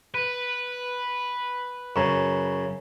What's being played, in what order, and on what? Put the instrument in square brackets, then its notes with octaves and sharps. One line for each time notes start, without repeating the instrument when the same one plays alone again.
[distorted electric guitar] B4
[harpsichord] F#2 C#3 [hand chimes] C#5 A#5 C#6